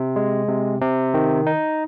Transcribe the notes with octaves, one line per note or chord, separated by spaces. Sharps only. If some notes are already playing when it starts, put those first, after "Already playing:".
Already playing: C3
G#3
C3
C3
D#3
D#4